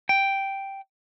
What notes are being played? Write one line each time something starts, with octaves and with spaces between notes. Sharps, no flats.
G5